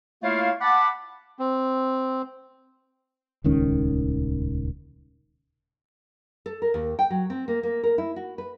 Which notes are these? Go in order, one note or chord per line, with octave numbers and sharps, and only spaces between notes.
A3 A#3 E4 F4 C#5 F5
F#5 A5 B5 D6
C4
D#1 C#2 D#3 C#4
A4
A#4
D#2
G5
F#3
C4
A#3
A#3
A#4
E4
F#4
B4